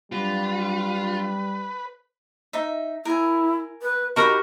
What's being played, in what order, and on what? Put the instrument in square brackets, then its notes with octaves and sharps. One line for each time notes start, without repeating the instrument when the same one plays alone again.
[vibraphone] F#3 C4 D4 [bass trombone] G3 [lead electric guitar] F4 [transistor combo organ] B4
[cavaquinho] D#4 E5
[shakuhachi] E4 [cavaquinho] A#4 G#5
[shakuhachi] B4
[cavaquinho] D#4 A#5 B5 [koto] F#4 A#4 [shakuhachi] G4